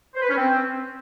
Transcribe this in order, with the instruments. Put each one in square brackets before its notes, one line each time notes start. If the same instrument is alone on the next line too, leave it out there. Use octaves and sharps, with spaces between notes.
[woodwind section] C5
B4
C#4
C4